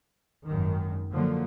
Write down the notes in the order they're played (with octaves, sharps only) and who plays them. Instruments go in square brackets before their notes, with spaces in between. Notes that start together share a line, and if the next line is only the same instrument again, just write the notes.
[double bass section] G#1 F#2 D#3
D3 F3 F#3 A#3